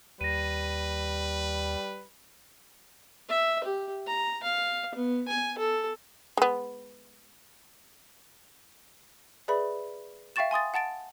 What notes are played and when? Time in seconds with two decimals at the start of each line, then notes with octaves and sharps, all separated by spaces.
0.21 D#2 G3 B4 A#6 D#7
3.29 E5
3.64 G4
4.07 A#5
4.43 F5
4.95 B3
5.28 G#5
5.58 A4
6.37 G#3 B3
9.48 G#4 B4 D5 E5 B5
10.36 E5 F5 G5 C#6 A6 E7
10.51 G#5 C6 D#6 A6
10.74 F#5 A5 A6 D7